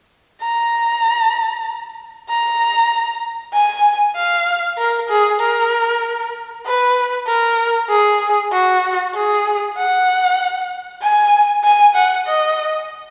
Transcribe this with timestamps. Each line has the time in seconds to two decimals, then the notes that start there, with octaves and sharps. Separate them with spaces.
0.42 A#5
2.29 A#5
3.54 G#5
4.16 F5
4.78 A#4
5.09 G#4
5.41 A#4
6.66 B4
7.27 A#4
7.90 G#4
8.52 F#4
9.14 G#4
9.77 F#5
11.02 G#5
11.64 G#5
11.95 F#5
12.26 D#5